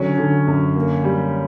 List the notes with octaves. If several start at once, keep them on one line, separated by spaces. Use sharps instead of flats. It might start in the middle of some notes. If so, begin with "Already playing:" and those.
Already playing: D3 F#3 C#4
D3
F#2
A#3
G3